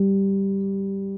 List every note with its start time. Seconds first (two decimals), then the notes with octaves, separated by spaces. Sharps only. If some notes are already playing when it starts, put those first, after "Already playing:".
Already playing: G3